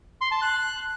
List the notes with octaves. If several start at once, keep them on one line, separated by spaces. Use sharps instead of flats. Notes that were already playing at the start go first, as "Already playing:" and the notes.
C6
A5
F#6